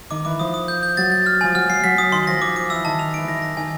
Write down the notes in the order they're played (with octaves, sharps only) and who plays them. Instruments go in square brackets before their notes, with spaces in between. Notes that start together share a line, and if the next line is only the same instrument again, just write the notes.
[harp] D#3 [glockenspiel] D6
[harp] E3 [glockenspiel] D6
[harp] F3 [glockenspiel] D#6
[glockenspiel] D#6
G6
G6
[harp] F#3 [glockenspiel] A6
[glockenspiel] A6
F6
[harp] F3 [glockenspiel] G#5
[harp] F#3 [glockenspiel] F6
[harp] F#3 [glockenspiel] C7
[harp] F#3 [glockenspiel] B6
[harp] F#3 [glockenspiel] D#6
[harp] D#3 [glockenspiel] C6
[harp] F3 [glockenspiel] A#6
[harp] F3 [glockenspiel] D6
[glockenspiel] D6
[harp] E3 [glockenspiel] E6
[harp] D#3 [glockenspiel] A5
[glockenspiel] F7
[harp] E3 [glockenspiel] D7
[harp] D#3 [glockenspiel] A#6
[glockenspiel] A#6
[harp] D#3 [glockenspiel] G#5